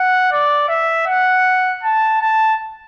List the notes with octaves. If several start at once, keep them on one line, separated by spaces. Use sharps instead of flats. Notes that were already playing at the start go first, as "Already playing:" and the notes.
Already playing: F#5
D5
E5
F#5
A5
A5